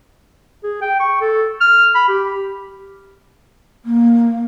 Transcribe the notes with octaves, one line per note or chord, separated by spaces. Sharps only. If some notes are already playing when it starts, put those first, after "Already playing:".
G#4
G5
C#6
A4
F6
B5
G4
A#3